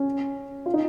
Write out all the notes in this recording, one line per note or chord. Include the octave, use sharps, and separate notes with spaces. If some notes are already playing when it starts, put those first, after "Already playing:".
Already playing: C#4
F4
D#4